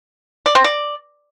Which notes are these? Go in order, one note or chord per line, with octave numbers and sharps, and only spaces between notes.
D5
C4
D5